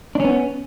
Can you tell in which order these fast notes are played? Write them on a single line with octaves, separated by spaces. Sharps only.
D4 C#4 B3